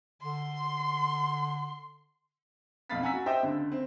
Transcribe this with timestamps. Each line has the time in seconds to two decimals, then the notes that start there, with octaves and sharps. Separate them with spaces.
0.22 D3 C6
2.90 B1 F2 F5 B5 A6 B6
3.02 C#4 F#5 G#5 A#5 E6 B6
3.13 F#4
3.26 G4 C5 D#5 E5 G5 E6
3.43 C#2 D3
3.72 C4